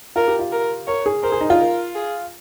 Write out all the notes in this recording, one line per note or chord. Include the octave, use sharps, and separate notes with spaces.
F4 A#4
G4
F4
A#4
A#4 C#5
G#4
A#4 C5
G#4
D#4
F4
A#4
G#4